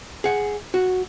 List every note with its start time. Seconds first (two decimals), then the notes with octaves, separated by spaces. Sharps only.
0.24 G#4 F#5
0.74 F#4